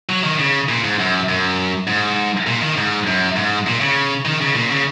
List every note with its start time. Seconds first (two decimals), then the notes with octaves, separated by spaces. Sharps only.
0.09 F#3
0.23 D#3
0.39 C#3
0.69 A#2
0.84 G#2
0.99 F#2
1.29 F#2
1.87 G#2
2.47 A#2
2.61 D#3
2.77 G#2
3.07 F#2
3.36 G#2
3.67 A#2
3.81 C#3
4.25 D#3
4.41 C#3
4.55 A#2
4.70 C#3